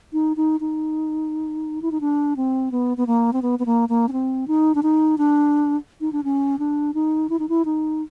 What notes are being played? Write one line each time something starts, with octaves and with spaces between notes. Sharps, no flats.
D#4
D#4
D#4
E4
D#4
D4
C4
B3
B3
A#3
C4
B3
B3
A#3
A#3
C#4
C4
D#4
D4
D#4
D4
D#4
D4
C#4
D4
D#4
E4
D#4
E4
D#4